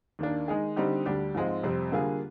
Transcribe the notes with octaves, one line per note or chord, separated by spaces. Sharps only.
D#2 D#3 A#3 D4
D#3 G#3 D#4 G#4
D3 G3 C4 D#4 G4
D2 D3 G3 D4 G4
G#2 F3 G#3 C4
F2 C3 G3 C4
D3 G3 A#3 F4 G#4